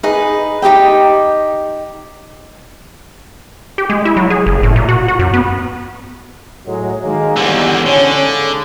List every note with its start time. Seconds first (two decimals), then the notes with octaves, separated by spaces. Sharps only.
0.03 D#4 G#4 B4 D#5
0.62 D#4 G4 D#5 G5
3.78 G4
3.90 G#3
4.05 E4
4.17 F#3
4.30 G#4
4.46 F#1
4.63 A2
4.76 A#2
4.89 F#4
5.08 F#4
5.19 F#2
5.34 B3
6.67 A2 F#3 G#3
7.04 D#3 G#3 A#3
7.37 G1 E2 G#2 D3 G4
7.86 D3 C#4
8.21 G#2 C#3